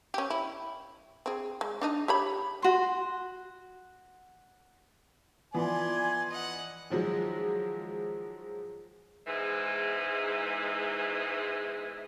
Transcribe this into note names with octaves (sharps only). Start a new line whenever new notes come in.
C#4 G4
E4
C4 G#4
G#3
D4 D#4 D#5
G4 C#5 B5
F#4 C6
E3 F3 B3 D5 G#5 C6
D#5 F#5
D#3 F3 F#3 G#3
E2 G#2 E3 G#3